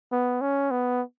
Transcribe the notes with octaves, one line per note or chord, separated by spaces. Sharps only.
B3
C#4
B3